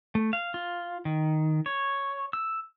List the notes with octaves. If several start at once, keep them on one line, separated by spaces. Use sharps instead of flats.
A3
F5
F4
D#3
C#5
E6